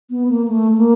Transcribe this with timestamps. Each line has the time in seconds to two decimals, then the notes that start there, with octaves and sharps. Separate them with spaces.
0.10 B3
0.29 A#3
0.48 A3
0.78 A#3